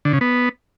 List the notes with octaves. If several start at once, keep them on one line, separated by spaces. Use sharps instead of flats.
D3
C#3
B3